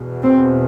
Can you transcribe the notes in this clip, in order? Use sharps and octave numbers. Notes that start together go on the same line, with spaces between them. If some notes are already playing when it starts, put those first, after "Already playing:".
Already playing: E2 B2
C4